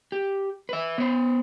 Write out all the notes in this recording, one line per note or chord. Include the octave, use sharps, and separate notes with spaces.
G4
B4 E5
B3 C5